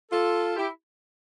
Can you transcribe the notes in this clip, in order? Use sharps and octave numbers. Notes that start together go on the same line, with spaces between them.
F4 A4
E4 G4